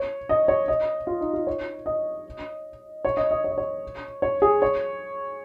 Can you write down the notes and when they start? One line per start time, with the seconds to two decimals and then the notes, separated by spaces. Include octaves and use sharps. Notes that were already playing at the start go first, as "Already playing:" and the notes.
Already playing: C#5
0.29 D#5
0.48 C#5
0.68 D#5
1.07 F4
1.21 D#4
1.33 F4
1.47 C#5
1.86 D#5
3.05 C#5
3.17 D#5
3.31 D#5
3.44 C#5
3.50 D#5
3.58 C#5
4.22 C#5
4.42 G#4
4.62 C#5